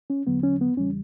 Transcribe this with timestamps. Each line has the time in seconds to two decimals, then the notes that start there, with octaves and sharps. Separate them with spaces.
0.10 C#4
0.27 E2 D3 F#3 B3
0.43 C#4
0.61 B3
0.77 E2 C#3 E3 G3 C#4